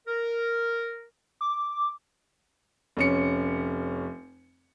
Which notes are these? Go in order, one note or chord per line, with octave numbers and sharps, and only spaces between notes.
A#4
D6
F1 C#4 C#7